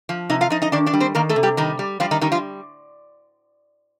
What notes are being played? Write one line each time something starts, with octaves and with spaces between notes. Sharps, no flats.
F3
C3 D#4 D#5
F4 F5
F3 D#4 D#5
D#4 D#5
D#3 D4 D5
D4 D5
G3
C4 C5
D#3 A#3 A#4
A3 A4
C3
G3 G4
D#3 G3 D#4
G3
F3 G3 F4
D#3 D#4
D#3 G3 D#4
F3 F4